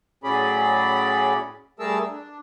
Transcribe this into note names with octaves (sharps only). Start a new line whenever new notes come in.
A2 F#3 C#4 G#4 D5 B5
G3 A3 G#4 A#4 A5 E6
D4